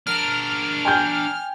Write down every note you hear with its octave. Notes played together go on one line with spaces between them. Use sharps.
D4 A#4 F6
G5 G#5 G6